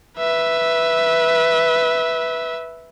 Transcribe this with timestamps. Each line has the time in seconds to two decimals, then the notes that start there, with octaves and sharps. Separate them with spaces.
0.18 B4 E5